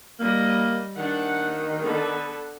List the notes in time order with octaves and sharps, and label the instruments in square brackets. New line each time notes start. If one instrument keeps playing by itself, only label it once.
[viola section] G3 D#5 [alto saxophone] A#3
[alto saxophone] D#3 [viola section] D4 F#5
[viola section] D3 B3 A4